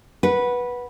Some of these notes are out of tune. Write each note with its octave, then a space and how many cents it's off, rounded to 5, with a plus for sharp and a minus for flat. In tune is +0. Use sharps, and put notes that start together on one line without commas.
B4 -10 F#5 +0